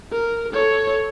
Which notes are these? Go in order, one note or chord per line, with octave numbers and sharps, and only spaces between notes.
A#4
A4 C#5